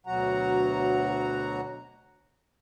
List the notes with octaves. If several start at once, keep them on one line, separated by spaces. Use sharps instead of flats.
D2 B2 F#3 F#4 F#5 A#5